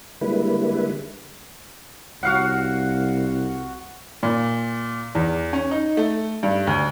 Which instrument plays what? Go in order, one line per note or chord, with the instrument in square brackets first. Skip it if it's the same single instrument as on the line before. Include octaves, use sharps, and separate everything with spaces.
[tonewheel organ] D3 G3 G#3 A#3 E4 B4
[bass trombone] C2 [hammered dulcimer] F#4 F5 F#5
[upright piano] A#2
E2
C#4
D#4
A3
G2
D2